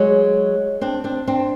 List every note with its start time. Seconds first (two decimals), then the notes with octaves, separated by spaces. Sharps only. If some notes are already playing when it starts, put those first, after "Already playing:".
Already playing: F#3 G#3
0.81 C4 D4
1.04 C4 D4
1.27 C4 D4